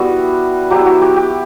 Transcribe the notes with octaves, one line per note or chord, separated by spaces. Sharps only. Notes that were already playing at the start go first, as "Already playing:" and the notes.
Already playing: G3 B3 E4 F#4
F#3 B3 E4 G4
F#4
G4
G4